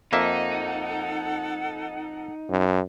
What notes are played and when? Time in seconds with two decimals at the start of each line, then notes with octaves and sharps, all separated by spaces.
0.13 F2 A#3 D#4 A4 E5 F#5
2.50 F#2